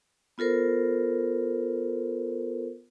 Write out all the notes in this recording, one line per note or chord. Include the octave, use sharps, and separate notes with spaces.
B3 F4 A4 A#4 C5